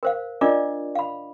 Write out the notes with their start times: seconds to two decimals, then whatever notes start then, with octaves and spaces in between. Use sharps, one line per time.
0.03 A#4 C5 F5
0.41 D4 F4 A#4 D5 D#5 D6
0.95 F5 B5